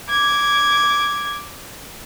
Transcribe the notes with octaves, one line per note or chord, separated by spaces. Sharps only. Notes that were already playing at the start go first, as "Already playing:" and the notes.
D6 G#6